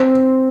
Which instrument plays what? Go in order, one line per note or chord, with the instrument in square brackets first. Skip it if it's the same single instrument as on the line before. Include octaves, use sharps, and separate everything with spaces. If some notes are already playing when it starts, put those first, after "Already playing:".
Already playing: [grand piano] C4